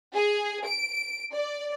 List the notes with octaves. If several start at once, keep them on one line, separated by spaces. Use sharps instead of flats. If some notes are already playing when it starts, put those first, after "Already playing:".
G#4
D7
D5